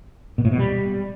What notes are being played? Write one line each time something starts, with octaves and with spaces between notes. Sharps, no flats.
B2
A2
B2
G3